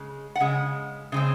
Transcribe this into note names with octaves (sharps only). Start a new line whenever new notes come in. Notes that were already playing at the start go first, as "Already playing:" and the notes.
Already playing: C#3 G#3
F#5
C#3 G#3
C#3 G#3 C4